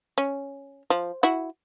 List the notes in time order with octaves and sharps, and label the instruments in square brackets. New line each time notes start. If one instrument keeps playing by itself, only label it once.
[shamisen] C#4
F3
E4 F#4